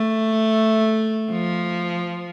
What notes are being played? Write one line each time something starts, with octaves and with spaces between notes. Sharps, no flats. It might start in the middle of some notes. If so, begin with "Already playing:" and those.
Already playing: A3
F3